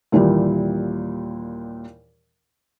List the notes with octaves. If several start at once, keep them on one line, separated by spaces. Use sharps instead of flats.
D#2 A#2 E3 G3